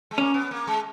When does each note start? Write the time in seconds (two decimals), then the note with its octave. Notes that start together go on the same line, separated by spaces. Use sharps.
0.11 G#3
0.17 A#3 C#4
0.34 B3
0.51 A#3
0.67 G#3